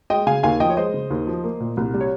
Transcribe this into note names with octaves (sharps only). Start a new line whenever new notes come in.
G#3 D#5 G5
C#3 F5 G#5
D#2 F5 G#5
F3 D#5 G5
C#5
G#3 C5 D#5
C#3
D#2
F3
A#3
A#2
C2
G3
C#5